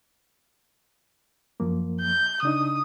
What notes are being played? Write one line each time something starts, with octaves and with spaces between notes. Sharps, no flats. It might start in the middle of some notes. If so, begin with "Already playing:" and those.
F#2 F3 A#3
G6
C#3 D4 D#4 D#6